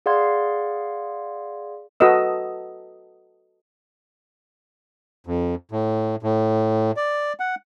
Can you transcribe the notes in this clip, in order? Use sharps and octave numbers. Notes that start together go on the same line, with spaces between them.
G#4 D5 F5 F#5 C6 G#6
F#4 A4 B4 D#5 E6
F2
A2
A2
D5
F#5